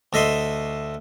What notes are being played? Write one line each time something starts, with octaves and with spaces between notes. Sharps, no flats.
D2 A4 D#5 E5 C6